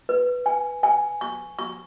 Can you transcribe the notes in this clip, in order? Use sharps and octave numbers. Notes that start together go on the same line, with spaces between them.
B4
G#5
G#5
C#6
C#6